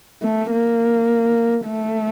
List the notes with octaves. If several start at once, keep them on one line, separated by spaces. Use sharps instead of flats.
A3
A#3
A3